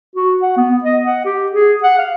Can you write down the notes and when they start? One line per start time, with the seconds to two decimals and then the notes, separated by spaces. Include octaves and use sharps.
0.15 F#4
0.42 F#5
0.57 B3
0.84 D#5
1.05 F#5
1.25 G4
1.51 G#4
1.83 F#5
1.98 F5